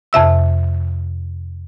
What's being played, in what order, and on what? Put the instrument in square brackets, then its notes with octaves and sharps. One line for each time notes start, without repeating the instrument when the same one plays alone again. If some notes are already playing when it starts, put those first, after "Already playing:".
[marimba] F2 C3 E5 E6